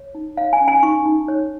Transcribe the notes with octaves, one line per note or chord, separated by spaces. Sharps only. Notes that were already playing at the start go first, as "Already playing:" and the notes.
Already playing: C#5
D#4
C#5 F5
G#5
C#4
G#5
D#4 C#6
D#4
C#5